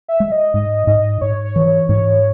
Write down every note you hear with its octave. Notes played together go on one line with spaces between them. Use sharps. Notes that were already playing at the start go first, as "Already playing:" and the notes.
E5
G#3
D#5
G#2 D#5
G#2 D#5
G#2 C#5
C#5
E3
C#5
G#2 C#5